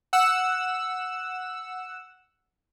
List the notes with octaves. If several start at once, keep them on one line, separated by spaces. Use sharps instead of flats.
F#5 E6